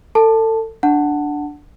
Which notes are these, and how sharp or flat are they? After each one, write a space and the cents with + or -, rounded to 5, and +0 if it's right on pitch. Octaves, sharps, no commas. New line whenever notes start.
A4 +30 A5 +0
D4 +0 F#5 +0 A5 +15